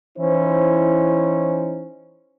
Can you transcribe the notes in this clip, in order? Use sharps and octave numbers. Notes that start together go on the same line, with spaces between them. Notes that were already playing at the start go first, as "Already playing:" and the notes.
E3 C#4 D#4 E4 C5